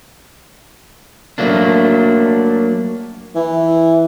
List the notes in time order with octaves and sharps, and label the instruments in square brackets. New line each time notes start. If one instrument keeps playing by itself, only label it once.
[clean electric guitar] F#3 A3 A#3 D4
[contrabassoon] E3